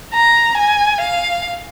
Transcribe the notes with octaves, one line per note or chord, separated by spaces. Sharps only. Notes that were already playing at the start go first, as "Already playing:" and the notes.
A#5
G#5
F5